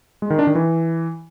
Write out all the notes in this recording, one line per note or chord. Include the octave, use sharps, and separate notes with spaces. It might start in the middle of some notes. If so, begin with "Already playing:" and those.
G#3
D#3
D4
D#3
E3